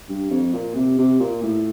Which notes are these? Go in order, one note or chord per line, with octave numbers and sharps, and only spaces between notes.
G2
F2
A#2
C3
C3
A#2
A2